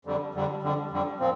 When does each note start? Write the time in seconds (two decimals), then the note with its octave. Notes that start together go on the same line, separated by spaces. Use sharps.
0.05 F2 D3 G3
0.34 F2 D3 G3
0.62 F2 D3 G3
0.91 F2 D3 G3
1.20 A#2 F3 C4